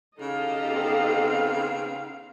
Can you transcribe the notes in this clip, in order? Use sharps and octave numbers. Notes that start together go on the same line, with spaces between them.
C#3 D#4 G4 A4 D#5 F5
B3 C4